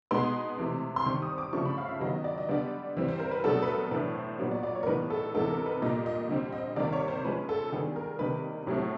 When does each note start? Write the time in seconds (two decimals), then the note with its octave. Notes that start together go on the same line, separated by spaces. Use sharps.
0.11 B2 G#3 B3 D#4 C6
0.58 C3 E3 A3
0.96 C6
1.05 D#3 G3 C4 C#6
1.22 D#6
1.38 D6
1.53 C#3 F3 A3 D4 C#6
1.65 B5
1.78 F5
1.89 E5
2.01 D#3 F#3 B3 D#5
2.24 D5
2.38 D#5
2.49 D3 G3 B3 D4 D5
2.97 E3 G3 C4
3.08 C5
3.19 A#4
3.31 B4
3.44 B2 F#3 A3 D4 A4
3.62 B4
3.67 A#4
3.91 A2 E3 A3 D4 B4
4.15 C5
4.39 A#2 F#3 B3 C#5
4.51 D5
4.63 D5
4.75 C#5
4.83 A#4
4.86 A2 E3 G3 B3 D#4 B4
5.10 A4
5.34 C3 E3 G#3 B3 D#4 A4
5.51 A#4
5.66 B4
5.82 A#2 G3 A#3 D#5
6.06 D#5
6.29 D3 G3 C4
6.52 D#5
6.76 C3 D#3 G3 A#3 D5
6.93 C#5
7.08 C5
7.24 F3 G#3 C#4 B4
7.49 A4
7.72 D#3 G3 B3 D4 G#4
7.96 A#4
8.19 C3 D#3 G3 A#3 D#4 B4
8.67 A2 F#3 A3 C4